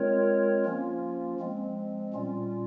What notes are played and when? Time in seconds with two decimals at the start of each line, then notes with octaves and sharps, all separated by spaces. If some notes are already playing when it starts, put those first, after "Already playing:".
Already playing: G#3 C4 F4 A#4 C#5
0.65 F3 A#3 C#4 F4
1.39 F3 G#3 C4
2.14 A#2 G3 C#4 F4